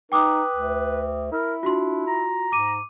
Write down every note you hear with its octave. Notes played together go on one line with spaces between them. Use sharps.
D#4 B4 G5 D6 D#6
D2
E4 A#4
D4 F4 F#4 C6
A#5
G#2 D6 D#7